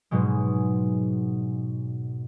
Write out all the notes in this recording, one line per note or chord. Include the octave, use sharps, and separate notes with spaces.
G#2 B2 F#3 G#3